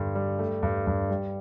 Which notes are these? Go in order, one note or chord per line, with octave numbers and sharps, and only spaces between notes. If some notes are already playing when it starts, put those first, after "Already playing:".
Already playing: G2 D3 G3
G3
A3
G2
G2
G3